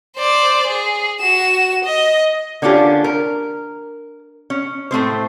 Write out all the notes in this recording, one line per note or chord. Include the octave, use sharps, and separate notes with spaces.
C5 D5
G#4
F#4 E7
D#5
D3 A#3 C#4 D4 F4 G4
A#4
C#4
A2 A3 C4 C5